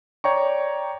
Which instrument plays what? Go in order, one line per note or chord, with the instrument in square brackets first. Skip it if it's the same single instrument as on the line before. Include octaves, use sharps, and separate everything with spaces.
[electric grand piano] C#5 D5 G5 A#5 C#6